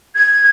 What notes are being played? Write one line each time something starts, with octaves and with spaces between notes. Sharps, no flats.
G#6